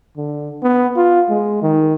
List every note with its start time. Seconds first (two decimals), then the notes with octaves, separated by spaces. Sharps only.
0.17 D3
0.63 B3
0.96 F4
1.30 G#3
1.62 D#3